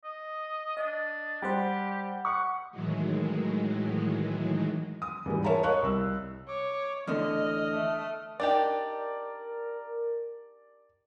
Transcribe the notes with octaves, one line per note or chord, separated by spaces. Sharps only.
D#5
D4 D#5 D#6
G3 G4 C5 F#5 G5
F#5 C#6
A2 D#3 E3 F#3 G#3
D#6
E2 G#2 G3
A#4 C#5 E5 A5 A#5
A#4 C#5 D#5 F5 C#6 F#6
C2 E6
C#5 D6
E2 A2 D3 D#5 D#6 F6
A3
D4 D#4 G4 A#4 D5